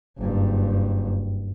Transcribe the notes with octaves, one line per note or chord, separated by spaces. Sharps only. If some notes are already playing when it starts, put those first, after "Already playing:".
F#1 G2